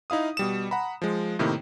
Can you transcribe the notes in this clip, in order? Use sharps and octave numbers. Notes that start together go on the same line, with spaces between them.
D#4 E4 F5 D#6
B2 G3 E7
F#5 A#5 B5
F3 G#3
A2 C3 D#3 A#3 E4